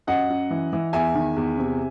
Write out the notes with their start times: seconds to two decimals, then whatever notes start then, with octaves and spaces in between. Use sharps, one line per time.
0.07 F#2 D#5 F#5
0.29 F#2
0.51 E3
0.73 E3
0.93 E2 E5 G#5
1.15 D#3
1.37 E2
1.58 C3